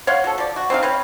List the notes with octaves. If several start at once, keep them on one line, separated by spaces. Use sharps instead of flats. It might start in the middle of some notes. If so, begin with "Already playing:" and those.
C#5 F5 F#5 C6
F#4 A4
F3 D5
F#4
C4 D#4 A#4 F5
C4 B4 C#5